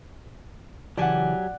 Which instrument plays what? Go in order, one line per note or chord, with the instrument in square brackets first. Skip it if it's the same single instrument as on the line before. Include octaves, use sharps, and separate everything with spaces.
[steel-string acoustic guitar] C#3 E3 A5 [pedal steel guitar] F#3 G4 G#5 [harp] D5 F#5